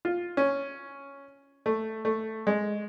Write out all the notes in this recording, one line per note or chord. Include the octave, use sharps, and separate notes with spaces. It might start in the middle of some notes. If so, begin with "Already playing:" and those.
F4
C#4
A3
A3
G#3